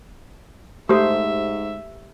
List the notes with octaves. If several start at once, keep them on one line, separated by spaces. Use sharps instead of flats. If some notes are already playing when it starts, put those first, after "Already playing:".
G#2 A3 G4 A4 C5 E5